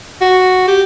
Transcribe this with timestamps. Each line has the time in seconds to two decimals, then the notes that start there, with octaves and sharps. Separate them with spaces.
0.21 F#4
0.68 G4